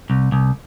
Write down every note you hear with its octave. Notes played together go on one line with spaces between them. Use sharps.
C2
C2